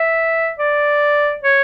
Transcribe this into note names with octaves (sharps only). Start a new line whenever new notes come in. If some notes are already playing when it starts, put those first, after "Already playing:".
Already playing: E5
D5
C#5